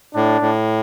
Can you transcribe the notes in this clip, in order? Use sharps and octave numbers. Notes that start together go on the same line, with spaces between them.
A2 D4
A2